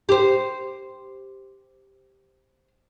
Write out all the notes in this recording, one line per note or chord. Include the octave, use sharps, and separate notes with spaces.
G4 C5